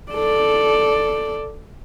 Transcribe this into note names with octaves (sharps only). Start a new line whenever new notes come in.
A4 D5